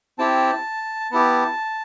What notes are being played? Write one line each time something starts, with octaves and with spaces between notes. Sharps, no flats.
C4 E4 G4 A5
B3 E4 G4